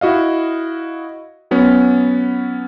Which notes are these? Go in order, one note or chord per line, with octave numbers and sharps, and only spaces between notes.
E4 F#4 D#5 F5
F#3 B3 C#4